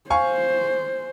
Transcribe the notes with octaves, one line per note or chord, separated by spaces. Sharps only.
C5 F5 G#5 C#6